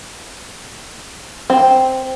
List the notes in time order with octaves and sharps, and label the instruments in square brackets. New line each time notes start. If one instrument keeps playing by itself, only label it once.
[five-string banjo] C4